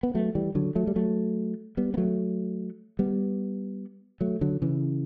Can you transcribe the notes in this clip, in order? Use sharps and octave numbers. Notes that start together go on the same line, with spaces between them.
B3
F#3 A3
E3 G3
D3 F#3
F#3 A3
G3
F#3 A3
G3 B3
B3
F#3 A3
G3 B3
F#3 A3
D3 F#3
C#3 E3